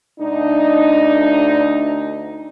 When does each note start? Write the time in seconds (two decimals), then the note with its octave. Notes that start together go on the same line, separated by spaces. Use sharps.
0.20 D2 D4 D#4